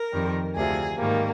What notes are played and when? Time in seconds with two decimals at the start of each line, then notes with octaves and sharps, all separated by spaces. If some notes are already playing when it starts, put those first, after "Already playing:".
Already playing: A#4
0.13 F2 D#3 G3
0.56 D2 C3 F3 G#4
0.99 G#2 D#3 G3 A#3